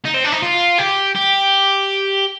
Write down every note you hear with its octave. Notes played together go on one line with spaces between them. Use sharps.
D#4
C4
D4
D#4
F4
G4
G4